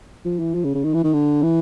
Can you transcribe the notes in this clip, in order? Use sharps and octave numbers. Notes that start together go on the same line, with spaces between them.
F3
E3
F3
C#3
C#3
D#3
E3
D#3
D3
E3